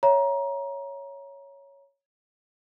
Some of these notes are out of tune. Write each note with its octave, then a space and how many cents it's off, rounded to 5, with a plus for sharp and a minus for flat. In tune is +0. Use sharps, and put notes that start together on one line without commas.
C#5 +0 E5 +0 A#5 +25